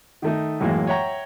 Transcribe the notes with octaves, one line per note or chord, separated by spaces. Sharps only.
D#3 A3 D#4
F#2 A2 E3 G#3 A#3
C#5 E5 F#5 G5 A#5 C#6